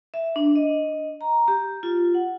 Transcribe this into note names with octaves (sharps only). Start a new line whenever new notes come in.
E5
D4
D#5
A#5
G4
F4
F#5